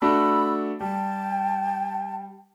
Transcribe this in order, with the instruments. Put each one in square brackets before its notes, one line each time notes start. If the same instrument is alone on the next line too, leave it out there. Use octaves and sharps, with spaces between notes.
[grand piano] A3 D4 F#4 [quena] B5 [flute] E6
[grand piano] G3 [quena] G5 [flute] A5